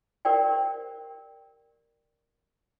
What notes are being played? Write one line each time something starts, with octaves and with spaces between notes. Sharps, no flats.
G4 A#4 C5 D5 G5